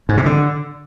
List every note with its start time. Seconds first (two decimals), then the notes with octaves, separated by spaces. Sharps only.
0.09 G#2
0.17 C3
0.26 D3